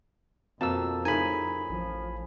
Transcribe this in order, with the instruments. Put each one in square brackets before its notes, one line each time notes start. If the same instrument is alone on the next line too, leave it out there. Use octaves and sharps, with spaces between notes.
[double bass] F2 [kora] B2 F3 A#3 [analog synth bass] C4 [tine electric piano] A5 E6
[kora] A2 C#3 A#4 [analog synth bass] D#4 [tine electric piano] G#5 B5
[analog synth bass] A1 [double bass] F3